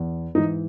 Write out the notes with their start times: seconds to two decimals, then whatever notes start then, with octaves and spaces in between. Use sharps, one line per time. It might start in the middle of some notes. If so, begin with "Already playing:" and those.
Already playing: E2
0.35 G#2 D#4
0.38 E3